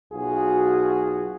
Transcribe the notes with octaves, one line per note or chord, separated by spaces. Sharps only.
B1 F4 F#4 G#4